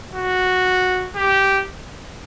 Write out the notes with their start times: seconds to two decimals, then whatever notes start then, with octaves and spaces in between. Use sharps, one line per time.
0.14 F#4
1.16 G4